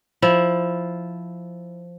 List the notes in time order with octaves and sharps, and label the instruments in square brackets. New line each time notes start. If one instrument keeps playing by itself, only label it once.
[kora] F3 E4